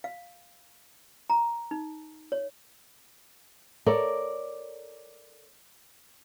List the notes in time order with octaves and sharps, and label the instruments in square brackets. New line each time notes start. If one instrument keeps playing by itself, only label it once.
[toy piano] F5
A#5
D#4
C#5
[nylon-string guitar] A4 A#4 C#5 D5